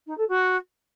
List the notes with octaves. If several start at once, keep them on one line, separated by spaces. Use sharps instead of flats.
D#4
A4
F#4